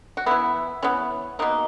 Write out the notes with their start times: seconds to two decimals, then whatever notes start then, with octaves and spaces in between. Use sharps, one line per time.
0.17 F#4
0.26 E3 B3 E4
0.83 E3 B3 C#4
1.39 B2 A#3 D#4